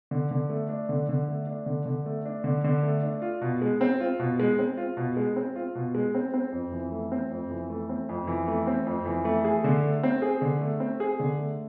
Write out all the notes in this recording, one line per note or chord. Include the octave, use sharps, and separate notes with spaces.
D3
D3
A3
D4
D3
D3
A3
D4
D3
D3
A3
D4
D3
D3
A3
D4
F4
B2
G#3
C4
F4
B2
G#3
C4
F4
B2
G#3
C4
F4
B2
G#3
C4
C4
F2
E3
A3
C4
F2
E3
A3
C4
F2
E3
A3
C4
F2
E3
A3
G#4
D3
A3
C4
G#4
D3
A3
C4
G#4
D3
A3